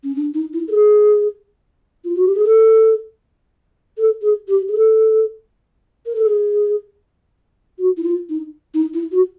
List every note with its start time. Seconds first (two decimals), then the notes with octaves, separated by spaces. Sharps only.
0.04 C#4
0.16 D4
0.34 D#4
0.53 E4
0.68 A4
0.72 G#4
2.04 F4
2.15 F#4
2.25 G4
2.35 G#4
2.44 A4
3.97 A4
4.22 G#4
4.48 G4
4.68 G#4
4.74 A4
6.06 A#4
6.15 A4
6.25 G#4
7.78 F#4
7.97 E4
8.04 F4
8.29 D#4
8.74 D#4
8.94 E4
9.12 F#4